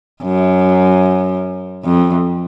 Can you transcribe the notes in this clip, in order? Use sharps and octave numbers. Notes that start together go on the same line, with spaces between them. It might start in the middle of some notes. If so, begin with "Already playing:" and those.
F#2
F2